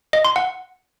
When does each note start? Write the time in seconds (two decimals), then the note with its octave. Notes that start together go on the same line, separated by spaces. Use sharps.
0.13 D#5
0.25 C6
0.36 F#5